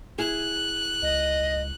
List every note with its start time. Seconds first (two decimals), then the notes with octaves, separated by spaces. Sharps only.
0.18 E4 G#4 F#6
1.02 C#2 D#5